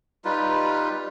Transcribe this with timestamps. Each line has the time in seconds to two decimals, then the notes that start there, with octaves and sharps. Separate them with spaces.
0.25 G3 D#4 F4 B4